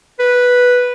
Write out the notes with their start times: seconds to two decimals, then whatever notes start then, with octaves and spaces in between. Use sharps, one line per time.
0.19 B4